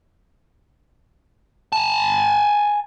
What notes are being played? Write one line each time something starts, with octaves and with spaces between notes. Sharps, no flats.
G#5 A5